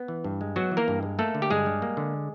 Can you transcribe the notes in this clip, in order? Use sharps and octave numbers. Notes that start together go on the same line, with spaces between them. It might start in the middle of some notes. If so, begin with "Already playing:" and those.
Already playing: B3
E3
G2
G#3
F#3 B3 F#4
E3
A#3 A#4
G2
G#3
A3 A#3 A4
D3
G4
G2 G#3 G#4
G3
A#3
D3